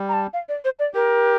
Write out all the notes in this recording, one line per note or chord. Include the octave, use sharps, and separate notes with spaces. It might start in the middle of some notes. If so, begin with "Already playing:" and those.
Already playing: G3
A#5
A5
F5
D5
C5
D5
G4 A#4